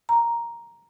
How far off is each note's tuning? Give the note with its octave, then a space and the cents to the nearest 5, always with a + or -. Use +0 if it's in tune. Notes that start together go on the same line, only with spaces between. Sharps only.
A#5 +5